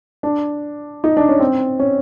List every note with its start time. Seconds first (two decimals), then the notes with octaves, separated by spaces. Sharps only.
0.23 D4
1.04 D#4
1.17 D4
1.29 C#4
1.40 C4
1.79 C#4